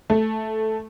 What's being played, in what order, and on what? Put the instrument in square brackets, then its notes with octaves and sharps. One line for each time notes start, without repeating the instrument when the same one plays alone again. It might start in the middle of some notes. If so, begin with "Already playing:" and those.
[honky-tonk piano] A3